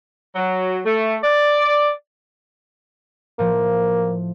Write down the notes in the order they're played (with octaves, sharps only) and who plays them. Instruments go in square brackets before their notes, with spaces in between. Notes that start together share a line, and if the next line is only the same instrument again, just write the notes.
[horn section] F#3
A3
D5
[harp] A2 F3 [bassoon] A#3